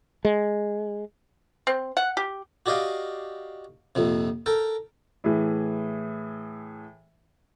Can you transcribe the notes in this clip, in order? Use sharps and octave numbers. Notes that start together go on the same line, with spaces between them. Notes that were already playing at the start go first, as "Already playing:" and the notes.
G#3
C4
F#5
G4
F#4 G4 D5 D#5 F5 G5
A#1 F2 C3
A4 A#4 G5
A2 E3 G#4